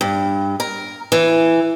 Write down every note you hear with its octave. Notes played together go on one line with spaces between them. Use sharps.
G2
A#4
E3